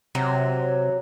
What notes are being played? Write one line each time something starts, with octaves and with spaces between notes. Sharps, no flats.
C3 F#3